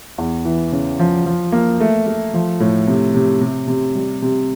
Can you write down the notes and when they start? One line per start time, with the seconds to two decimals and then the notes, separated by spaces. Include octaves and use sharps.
0.18 E2
0.45 E3
0.72 C#3
0.99 F3
1.26 F3
1.52 A#3
1.80 A3
2.07 A3
2.34 F3
2.60 A2
2.87 C3
3.14 C3
3.41 C3
3.68 C3
3.95 G3
4.22 C3